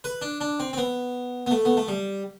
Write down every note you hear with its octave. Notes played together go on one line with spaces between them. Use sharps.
B4
D4
D4
C4
C4
B3
B3
A3
B3
A3
G3